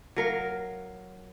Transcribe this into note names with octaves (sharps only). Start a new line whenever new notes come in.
F#3 A#4 F5